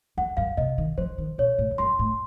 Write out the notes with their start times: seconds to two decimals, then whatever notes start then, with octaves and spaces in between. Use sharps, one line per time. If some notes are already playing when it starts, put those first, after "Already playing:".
0.17 F2 F#5
0.37 F#2 F5
0.57 C3 D#5
0.78 D#3
0.98 F3 C5
1.18 D#3
1.38 A#2 C#5
1.58 A2
1.71 F2
1.78 F#2 C6
1.99 A2